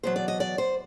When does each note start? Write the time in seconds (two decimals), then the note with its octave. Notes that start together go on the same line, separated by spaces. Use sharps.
0.03 E2 B2 F#3 C5
0.16 D5
0.28 D#5
0.40 D5
0.58 C5